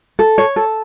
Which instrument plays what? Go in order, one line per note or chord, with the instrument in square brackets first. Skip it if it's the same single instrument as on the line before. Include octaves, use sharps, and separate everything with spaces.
[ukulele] A4
C#5
A4